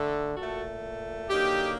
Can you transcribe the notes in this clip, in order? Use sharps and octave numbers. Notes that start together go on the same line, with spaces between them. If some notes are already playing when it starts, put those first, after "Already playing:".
Already playing: D3 A3
A#2 A3 F#4 A4
D3 F#3 A#3 D#4 G4